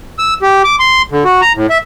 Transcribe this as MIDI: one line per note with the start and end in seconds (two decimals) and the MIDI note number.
0.19 0.34 88
0.42 0.63 67
0.64 0.76 86
0.79 1.02 84
1.12 1.24 50
1.25 1.41 66
1.42 1.53 82
1.55 1.66 45
1.70 1.78 76